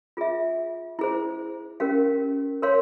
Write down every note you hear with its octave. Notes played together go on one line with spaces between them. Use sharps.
F4 G#4 E5
E4 G#4 C5
C#4 G4 A#4 F5
A#4 C#5 F5 C6